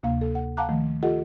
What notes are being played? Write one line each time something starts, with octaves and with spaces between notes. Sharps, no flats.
D2 C3 A#3 F5
A4
F#5
F5 F#5 A5 A#5 D6 F#6
D#3 F3 A3
F4 G4 A4 D#5 F#5